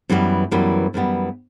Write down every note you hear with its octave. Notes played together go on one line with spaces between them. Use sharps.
F#2 E3 G3 B3
F#2 E3 G3 B3
F#2 E3 G3 B3